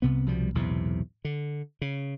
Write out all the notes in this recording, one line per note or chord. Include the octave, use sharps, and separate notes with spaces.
C2 C3 B3
C2 B2 F3 G3
B1 E2 A2 C3
D3
C#3